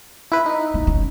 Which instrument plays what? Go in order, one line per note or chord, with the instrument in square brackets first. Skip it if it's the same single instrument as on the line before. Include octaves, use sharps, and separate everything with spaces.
[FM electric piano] E4 B4
D#4
[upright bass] B3
C#4